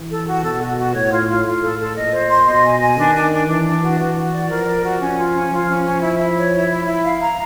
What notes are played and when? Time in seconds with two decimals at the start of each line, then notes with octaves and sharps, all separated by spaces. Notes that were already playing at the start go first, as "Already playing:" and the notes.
Already playing: E3
0.10 A4
0.27 F#4
0.44 B2 A4
0.60 F#4
0.78 F#4
0.94 A2 C#5
1.12 F4
1.28 F4
1.45 A2 F4
1.62 A4
1.79 A4
1.96 A#2 D#5
2.13 C5
2.30 C6
2.47 B2 D#5
2.64 G#5
2.81 G#5
2.97 D#3 D4
3.15 D4
3.32 D4
3.48 E3 D4
3.65 D4
3.82 F#4
4.00 E3 F#4
4.17 F#4
4.33 D5
4.50 F3 A#4
4.66 D5
4.83 F#4
5.01 C#4
5.17 F4
5.34 C#4
5.51 F3 F4
5.68 C#4
5.85 C#4
6.02 E4
6.19 E4
6.36 C#5
6.53 E4
6.71 E4
6.86 E4
7.04 F5
7.21 A#5